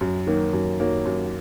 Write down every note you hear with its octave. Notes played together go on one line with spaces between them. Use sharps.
F#2
D#3 F#3 A#3
F#2
D#3 F#3 A#3
F#2